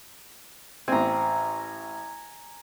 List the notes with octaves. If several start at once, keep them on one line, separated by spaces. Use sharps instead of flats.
A1 C4 G#5 A#5